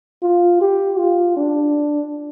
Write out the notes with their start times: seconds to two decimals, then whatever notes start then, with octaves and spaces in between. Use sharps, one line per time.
0.23 F4
0.61 G4
0.99 F4
1.37 D4